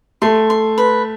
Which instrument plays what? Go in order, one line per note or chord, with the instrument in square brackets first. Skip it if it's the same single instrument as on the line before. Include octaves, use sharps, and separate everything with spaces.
[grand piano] A3 [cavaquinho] C6
[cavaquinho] C6
B4